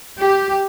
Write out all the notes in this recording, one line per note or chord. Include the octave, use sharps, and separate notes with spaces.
G4